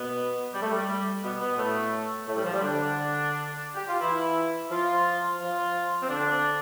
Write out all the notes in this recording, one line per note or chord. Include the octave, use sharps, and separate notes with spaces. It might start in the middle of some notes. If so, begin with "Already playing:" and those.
Already playing: B2 B3
G3
A3
G3
B2 B3
B2 B3
A2 A3
A2 A3
G3
F3
G3
D3 D4
G4
F4
E3 E4
F3 F4
F3 F4
C4
D3 D4